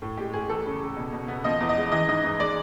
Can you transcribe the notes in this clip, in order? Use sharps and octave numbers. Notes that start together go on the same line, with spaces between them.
A2
G#3 G4
A2 G#4
E2 A4
C#3
C#3
B2
B2
B3
F3 D#5
E2
D#5
G#3
E3 D#5
G#2 D#5
G#2
G#3 D5